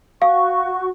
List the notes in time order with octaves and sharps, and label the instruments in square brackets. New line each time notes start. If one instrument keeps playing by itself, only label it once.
[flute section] F#4 C#6 [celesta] F5